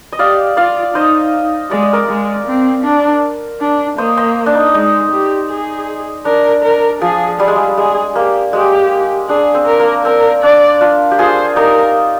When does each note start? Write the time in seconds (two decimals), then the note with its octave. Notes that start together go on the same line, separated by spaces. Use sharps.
0.12 D#5
0.19 G4 D5 F5
0.57 F4 D5 F5
0.95 D#4 C5 D#5
1.71 G#3 D5
1.83 D#5
1.93 A#4 D5
2.09 G#3
2.47 C4
2.85 D4
3.61 D4
3.98 A#3 C5 D#5
4.17 C5 D#5
4.46 D4
4.55 D#4
4.74 G#3 D#4
5.12 G4
5.50 G#4
6.25 D4 A#4
6.64 A#4
7.02 F3 G#4
7.40 G3 G#4
7.48 G#3
7.56 G3
7.77 G#3 G#4
8.15 A#3 G4
8.53 G#3 G4
9.29 D4 G#4
9.55 C4
9.67 A#4
9.80 A#3
10.05 C4 A#4
10.43 D4 D5
10.81 D4 F4
11.11 G4
11.19 F4 G#4 C5
11.56 D#4 G4 A#4